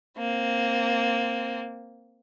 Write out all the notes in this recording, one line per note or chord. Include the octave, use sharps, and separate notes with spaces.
A#3 C4